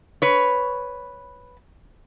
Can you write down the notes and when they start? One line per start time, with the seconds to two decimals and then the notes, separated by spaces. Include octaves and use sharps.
0.22 B4 C#5